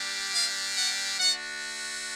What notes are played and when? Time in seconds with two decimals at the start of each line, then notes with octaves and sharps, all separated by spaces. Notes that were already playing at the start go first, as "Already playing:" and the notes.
Already playing: G3 A#3 D4 G4
0.32 F5
0.76 F#5
1.19 A3 D4 F#4 F#5